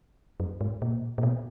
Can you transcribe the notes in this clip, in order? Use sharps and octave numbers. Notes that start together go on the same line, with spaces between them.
F#2
G#2
A#2
A#2
B2